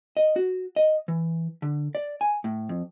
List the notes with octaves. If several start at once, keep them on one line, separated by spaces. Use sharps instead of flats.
D#5
F#4
D#5
E3
D3
D5
G#5
A2
F2